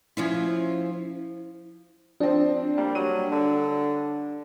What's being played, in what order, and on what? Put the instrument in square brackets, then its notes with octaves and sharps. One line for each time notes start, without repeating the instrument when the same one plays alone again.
[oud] F3 C#4 E4
[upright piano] F3 C4 [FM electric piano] D4
[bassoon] G3 [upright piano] A#3
[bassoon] F#3 [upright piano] G3 D#7
[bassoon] D3